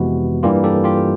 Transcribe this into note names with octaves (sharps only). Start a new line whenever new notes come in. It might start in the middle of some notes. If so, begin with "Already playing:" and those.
Already playing: F2 C3 E3 G#3 B3 F#4
G2 E3 G3 A#3 F4 G4
G4 A4
F4 G4